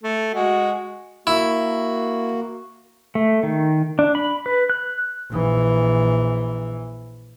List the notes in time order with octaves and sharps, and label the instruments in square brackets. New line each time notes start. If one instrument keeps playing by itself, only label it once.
[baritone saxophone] A3
[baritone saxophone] G#3 [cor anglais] F#4
[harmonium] A#3 F#4 [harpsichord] E4
[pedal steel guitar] A3
D#3
D4
B5
B4
F#6
[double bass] A#1 E3